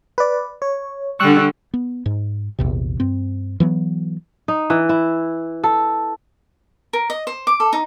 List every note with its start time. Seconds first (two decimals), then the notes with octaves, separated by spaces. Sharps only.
0.18 B4 D5
0.62 C#5
1.20 D3 G3 C#6 E6 F#6
1.74 B3
2.06 G#2
2.59 A#1 E2 C3
3.00 G2 C4
3.60 E3 F#3 B3
4.48 D#4
4.70 E3
4.89 E4
5.64 A4
6.93 A#4
7.10 D#5
7.27 C5
7.47 D6
7.60 A4
7.73 D#4